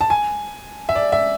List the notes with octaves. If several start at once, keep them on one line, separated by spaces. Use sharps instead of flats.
A5
G#5
E5
D5
E5